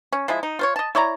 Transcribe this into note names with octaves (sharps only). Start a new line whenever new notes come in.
C#4
F3 G#3 E4
D#4
F4 C5 C#5
D#5 A5
E4 C#5 D5 A#5